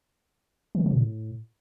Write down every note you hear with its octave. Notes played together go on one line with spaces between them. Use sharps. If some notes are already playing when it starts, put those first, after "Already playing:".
D#3
D3
E3
A#2
A2